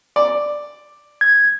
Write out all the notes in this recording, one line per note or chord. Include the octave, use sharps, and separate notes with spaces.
D5
G#6